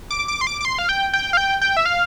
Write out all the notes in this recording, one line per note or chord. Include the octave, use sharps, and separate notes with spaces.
D6
D6
C6
D6
D6
C6
F5
G5
G5
F5
G5
G5
E5
F5